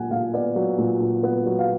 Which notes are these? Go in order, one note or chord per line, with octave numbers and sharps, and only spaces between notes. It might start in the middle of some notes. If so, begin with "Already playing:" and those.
Already playing: A#2 F#3 F#5 G#5
A#2 F5
B3 D5
F#3
A#2
A#2
B3
F#3
F5